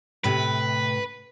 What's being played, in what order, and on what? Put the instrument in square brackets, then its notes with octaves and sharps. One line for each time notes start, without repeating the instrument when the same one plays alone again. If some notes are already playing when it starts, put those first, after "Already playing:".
[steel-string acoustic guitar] A2 C3 [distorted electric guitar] B4